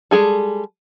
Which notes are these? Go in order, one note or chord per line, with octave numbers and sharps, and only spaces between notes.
G3 G#3 G#4 A4